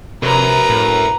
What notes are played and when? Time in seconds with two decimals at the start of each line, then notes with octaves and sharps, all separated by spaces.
0.23 C3 A#4 B4 C#5 A#5
0.70 A2